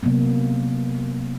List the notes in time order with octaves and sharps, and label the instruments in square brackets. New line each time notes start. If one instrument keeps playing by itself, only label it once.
[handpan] C3 F#3 A#3 B3